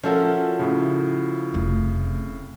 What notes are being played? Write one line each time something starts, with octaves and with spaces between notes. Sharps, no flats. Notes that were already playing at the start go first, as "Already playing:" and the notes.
F3 C#4 E4 F#4 A4 A#4
A2 C#3
F1 A3